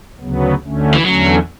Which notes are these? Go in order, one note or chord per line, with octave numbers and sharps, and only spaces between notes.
D2 C#3 F#3 B3
D2 D3 A3 C#4
E3
E2 D3 F#3 A3 C#4